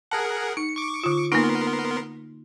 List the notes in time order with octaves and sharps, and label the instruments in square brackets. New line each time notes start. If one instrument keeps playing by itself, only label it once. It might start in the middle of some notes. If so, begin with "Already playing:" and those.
[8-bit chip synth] G#4 A#4 F#5 [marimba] A5
[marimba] D#4 [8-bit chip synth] C#7
[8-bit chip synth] C#6 D6
[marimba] D3 F4
[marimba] A#3 D#4 [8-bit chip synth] B3 A#4 C6